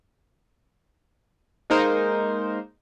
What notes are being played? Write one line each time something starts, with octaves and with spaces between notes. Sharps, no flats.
G#3 A#3 D#4 A#4 C5